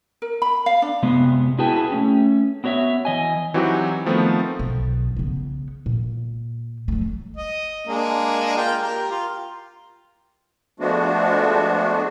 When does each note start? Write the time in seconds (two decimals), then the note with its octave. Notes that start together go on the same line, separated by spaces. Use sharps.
0.22 A#4
0.42 B5
0.66 F5
0.82 D4
1.02 C3 G#3 B3
1.58 E4 F#4 G#4 B4 G5 A5
1.92 A3 C#4
2.64 B3 F#4 C#5 D#5 E5
3.05 E3 D#5 G#5
3.54 E3 F#3 C4 D#4 F#4 G4
4.06 D#3 F3 A3 B3 C4
4.59 B1
5.17 C#3 B3
5.86 A#2
6.88 F#3 A3
7.36 D#5
7.87 G#3 A#3 D4
8.57 A#3 F4 G5
8.82 G4 A#4
9.11 F4
10.80 F3 G#3 A3 B3 D4 F#4